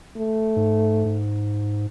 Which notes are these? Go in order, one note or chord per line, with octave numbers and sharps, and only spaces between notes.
A3
G#2
G#2